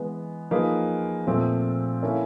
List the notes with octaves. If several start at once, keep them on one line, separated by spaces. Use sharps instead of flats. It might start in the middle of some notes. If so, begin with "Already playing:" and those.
Already playing: E3 G#3 B3
F3 A#3 D#4 G#4 B4
A#2 F3 A3 C4
A#3 C#4 E4 A4 C#5